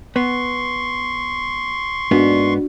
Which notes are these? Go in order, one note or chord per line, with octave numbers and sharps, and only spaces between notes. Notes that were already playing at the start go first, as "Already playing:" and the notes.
B3 C6 C#6
G#2 A#3 B3 D4 F#4